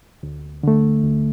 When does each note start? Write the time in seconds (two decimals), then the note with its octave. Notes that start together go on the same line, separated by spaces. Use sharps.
0.23 D2
0.63 D3 A3
1.03 D2